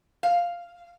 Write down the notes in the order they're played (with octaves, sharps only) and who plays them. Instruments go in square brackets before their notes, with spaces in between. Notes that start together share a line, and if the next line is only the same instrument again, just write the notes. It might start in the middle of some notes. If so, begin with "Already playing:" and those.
[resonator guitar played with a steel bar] F5